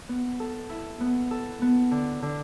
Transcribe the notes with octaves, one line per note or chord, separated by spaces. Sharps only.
B3
A4
E4
B3
A4
B3
D3
D3